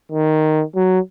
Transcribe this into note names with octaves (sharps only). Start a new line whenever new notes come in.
D#3
F#3